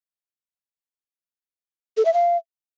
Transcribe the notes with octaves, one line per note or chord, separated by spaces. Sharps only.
A4
E5
F5